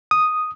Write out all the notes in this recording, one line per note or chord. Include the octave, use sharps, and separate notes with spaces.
D#6